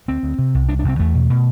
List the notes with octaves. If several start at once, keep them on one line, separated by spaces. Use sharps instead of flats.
D2 C4
D2
C3
C2
C2 D4
D4
C2 C4
E2 A3
B2
B2